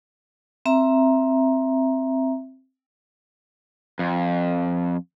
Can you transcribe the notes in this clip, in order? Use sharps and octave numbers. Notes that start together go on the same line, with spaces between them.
C4 E5 A#5
F2